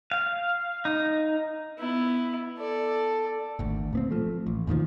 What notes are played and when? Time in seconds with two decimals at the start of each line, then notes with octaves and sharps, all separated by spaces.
0.12 F5
0.85 D#4
1.79 B3 E4
2.58 A4 D5
3.59 G#1 D2
3.93 A#2 B3 C4
4.10 F3 A3
4.47 A1
4.67 E2 A#2 D#3 F3